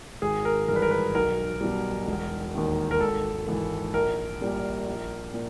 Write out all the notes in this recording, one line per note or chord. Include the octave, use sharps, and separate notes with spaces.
G#1 G#4
A#4
G2 E3 A#4 B4
A#4
B4
B1 A#4
B2 G3
E1
D#2 D#3
A#4
G#1 A4
G#2 E3
A#1 A#4
A#2 G3
A#1
A#2